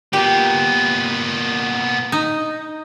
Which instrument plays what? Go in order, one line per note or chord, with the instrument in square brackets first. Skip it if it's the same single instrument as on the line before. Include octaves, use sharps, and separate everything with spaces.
[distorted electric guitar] A#2 B3 [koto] G4
[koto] D#4